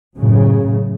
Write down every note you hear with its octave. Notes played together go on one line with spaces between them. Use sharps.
F#2 A2 C#3